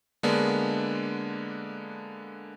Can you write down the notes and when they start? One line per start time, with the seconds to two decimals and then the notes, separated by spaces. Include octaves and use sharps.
0.23 D3 G#3 A#3 B3 D4